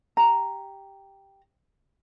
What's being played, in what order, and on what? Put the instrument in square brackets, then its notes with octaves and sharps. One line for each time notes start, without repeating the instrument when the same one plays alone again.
[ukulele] G4 A#5